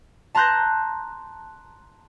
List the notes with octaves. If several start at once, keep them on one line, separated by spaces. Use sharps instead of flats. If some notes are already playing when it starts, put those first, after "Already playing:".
A5 A#5 C6 F#6 G6 A#6